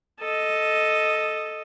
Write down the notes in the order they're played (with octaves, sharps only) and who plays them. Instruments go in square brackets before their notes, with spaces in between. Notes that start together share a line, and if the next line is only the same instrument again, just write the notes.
[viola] A4 D#5